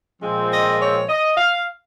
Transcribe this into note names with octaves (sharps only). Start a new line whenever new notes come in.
A#2 F3 G#3 C4
D#5
C#5
D#5
F5